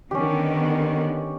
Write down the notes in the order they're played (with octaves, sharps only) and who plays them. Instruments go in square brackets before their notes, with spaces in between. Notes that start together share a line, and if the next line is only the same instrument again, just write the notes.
[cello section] D3 D#3 B3 [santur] C#4 G4